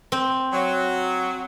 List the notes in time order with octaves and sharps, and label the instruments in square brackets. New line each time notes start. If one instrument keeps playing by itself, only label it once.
[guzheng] C4
[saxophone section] F#3